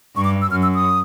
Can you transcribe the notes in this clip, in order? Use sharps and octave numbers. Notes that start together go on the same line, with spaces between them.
G2 C#6
D6
E6
F#2 F6
E6
D#6